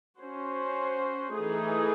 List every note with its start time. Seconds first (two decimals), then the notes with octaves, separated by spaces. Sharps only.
0.20 C#4 F#4 C5
1.34 E3 A3 D#4 G#4